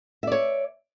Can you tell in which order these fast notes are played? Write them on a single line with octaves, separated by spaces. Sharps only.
E5 D5 C#5